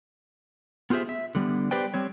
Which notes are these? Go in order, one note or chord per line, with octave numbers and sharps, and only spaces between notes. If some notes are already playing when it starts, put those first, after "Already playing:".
B3 F4 G4 G#4 C5 E5
E5
D3 G3 B3
G4 B4 C5 D5 G5
G3 C4 C#5